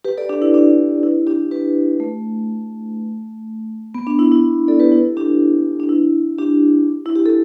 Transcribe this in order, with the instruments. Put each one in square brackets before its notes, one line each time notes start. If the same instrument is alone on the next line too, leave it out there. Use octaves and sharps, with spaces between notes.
[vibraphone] G4 B4
A4 D5
D4 G4
E4
D4
E4
D4 G4
G4 B4
A3
B3
D4
E4
E4
A4 D5
G4 B4
E4 A4
D4 G4
D4
E4
D4 G4
E4
G4
A4